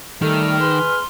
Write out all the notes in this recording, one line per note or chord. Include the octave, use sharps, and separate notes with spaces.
D#3 G3 A3 A4 F6
G#4 B4 C6